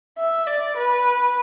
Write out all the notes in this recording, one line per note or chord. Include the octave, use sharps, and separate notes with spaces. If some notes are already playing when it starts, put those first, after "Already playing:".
E5
D5
B4